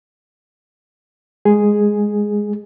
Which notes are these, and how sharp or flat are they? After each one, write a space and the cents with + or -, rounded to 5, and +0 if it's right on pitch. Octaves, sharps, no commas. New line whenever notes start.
G#3 -10 G#4 +0